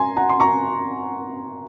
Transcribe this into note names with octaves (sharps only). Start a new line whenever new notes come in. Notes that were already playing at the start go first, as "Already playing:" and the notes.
Already playing: G#5 A#5 C6
F#5 A#5
C6
A#5 C#6